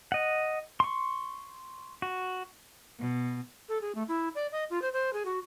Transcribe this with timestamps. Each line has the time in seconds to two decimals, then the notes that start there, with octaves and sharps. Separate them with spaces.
0.12 D#5 F#5
0.80 C6 C#6
2.02 F#4
3.00 B2
3.69 A4
3.81 G#4
3.95 A3
4.08 E4
4.35 D5
4.52 D#5
4.70 F4
4.82 C5
4.93 C5
5.13 G#4
5.25 F#4